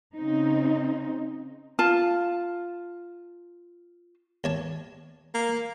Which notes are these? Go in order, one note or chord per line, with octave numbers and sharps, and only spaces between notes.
C#3 C4 D#4
F4 A5
D#2 C#5 A5
A#3